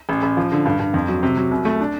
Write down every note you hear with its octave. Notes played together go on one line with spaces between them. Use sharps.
A1
A1
F3
D3
G2
G2
F2
F#3
C3
F#3
C2
A3
D4